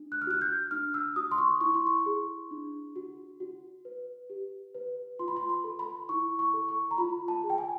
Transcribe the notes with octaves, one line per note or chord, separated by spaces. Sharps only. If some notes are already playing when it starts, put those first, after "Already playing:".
Already playing: D4
F#6
F6
F#4 F#6
G6
D4 F6
E6
F#4 D#6
C6
C#6
E4 C#6
C6
C#6
G#4
D4
F#4
F#4
B4
G4
B4
F4 C6
B5
C6
B5
A4
B5
E4 C#6
C#6
A4
C#6
A#5
F4 B5
A5
G#4
G5
G#5